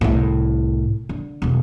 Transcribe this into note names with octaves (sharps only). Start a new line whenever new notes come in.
C2 A2
D3
E1 F2